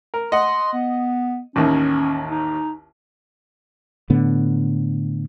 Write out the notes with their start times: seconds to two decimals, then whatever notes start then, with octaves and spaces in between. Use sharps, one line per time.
0.14 A#4
0.32 D#5 F#5 C6
0.73 B3
1.56 A1 D#2 D#3 C#4
2.31 D#4
4.10 A2 D3 B3